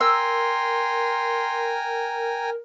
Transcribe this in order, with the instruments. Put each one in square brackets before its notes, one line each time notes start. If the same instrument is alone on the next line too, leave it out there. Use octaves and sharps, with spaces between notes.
[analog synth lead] A#4 [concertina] G5 G#5 A#5 [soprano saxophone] C6 [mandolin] E6